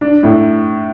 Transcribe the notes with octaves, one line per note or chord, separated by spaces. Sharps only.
D4
A2